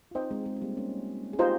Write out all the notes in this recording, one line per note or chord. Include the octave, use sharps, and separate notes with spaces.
F4
C4 D#4 C5 D#5 G5
G#3 C4
G#3 C4
C4
G3 A#3
A#3 C#4
G#4
D#4 F4 G4 C5 D#5 A#5